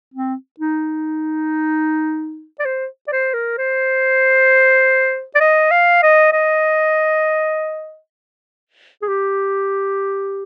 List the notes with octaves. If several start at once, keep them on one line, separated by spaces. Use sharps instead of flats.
C4
D#4
D5
C5
D5
C5
A#4
C5
D5
D#5
F5
D#5
D#5
G#4
G4